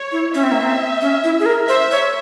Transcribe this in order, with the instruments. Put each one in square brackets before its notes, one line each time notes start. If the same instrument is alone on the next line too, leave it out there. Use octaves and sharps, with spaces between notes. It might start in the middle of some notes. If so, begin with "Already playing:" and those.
Already playing: [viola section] C#5
[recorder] E4
[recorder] C#4 [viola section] E5
[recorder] C4
A#3
C4
C#4
E4
G#4
A#4
[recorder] C5 [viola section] E5
[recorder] C#5